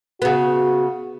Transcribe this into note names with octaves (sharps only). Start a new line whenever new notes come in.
C#3 B3 F#4